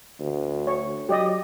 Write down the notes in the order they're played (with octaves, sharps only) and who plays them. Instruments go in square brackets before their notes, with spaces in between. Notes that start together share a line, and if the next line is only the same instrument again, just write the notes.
[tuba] D2
[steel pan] C#5
[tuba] F#3 [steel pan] G4 D5 D#5